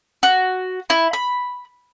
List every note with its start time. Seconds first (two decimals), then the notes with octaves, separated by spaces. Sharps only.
0.23 F#4
0.90 E4
1.13 B5